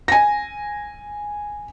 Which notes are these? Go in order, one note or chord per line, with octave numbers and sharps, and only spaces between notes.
G#5 A#6